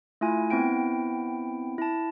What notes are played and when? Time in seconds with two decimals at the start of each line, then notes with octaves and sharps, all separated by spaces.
0.21 A3 E4 F4 G#5
0.50 B3 C4 E4 G5 D7
1.78 E4 A5